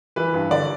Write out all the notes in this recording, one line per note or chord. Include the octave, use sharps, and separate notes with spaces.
E3 B4
G2
D3 D5